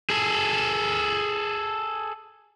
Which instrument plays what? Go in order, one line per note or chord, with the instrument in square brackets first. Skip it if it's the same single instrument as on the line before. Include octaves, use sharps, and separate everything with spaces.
[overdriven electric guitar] G#4 A4